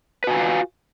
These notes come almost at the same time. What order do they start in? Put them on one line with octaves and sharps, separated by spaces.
B4 F#4 G#5 F4 F5